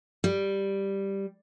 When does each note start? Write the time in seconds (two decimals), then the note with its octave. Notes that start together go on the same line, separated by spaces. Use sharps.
0.24 G3